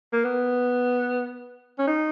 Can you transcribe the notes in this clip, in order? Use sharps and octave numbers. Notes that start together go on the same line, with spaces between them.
A#3
B3
C#4
D#4